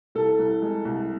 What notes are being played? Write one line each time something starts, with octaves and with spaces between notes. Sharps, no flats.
C2 A4
C2
G#3
C2